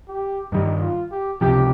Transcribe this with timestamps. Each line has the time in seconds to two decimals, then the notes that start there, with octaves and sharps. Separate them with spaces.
0.08 G4
0.52 G2 D#3 G3 D#4
0.81 F4
1.11 G4
1.41 C#2 C3 F3 G4